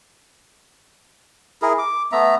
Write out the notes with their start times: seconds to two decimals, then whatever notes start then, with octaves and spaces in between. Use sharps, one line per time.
1.62 E4 G#4 A#4
1.78 D6
2.12 A3 B3 E5 A#5